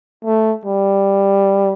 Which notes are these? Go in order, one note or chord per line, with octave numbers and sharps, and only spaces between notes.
A3
G3